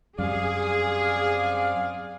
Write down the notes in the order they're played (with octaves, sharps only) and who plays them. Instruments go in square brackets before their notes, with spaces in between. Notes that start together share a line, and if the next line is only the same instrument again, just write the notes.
[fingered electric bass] F#2 G3 [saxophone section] C4 D5 F5 [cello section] G#4